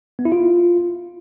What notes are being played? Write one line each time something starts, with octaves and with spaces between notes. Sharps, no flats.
B3
E4
F4